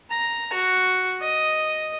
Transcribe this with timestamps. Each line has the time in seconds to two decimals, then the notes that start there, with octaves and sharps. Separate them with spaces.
0.10 A#5
0.53 F#4
1.21 D#5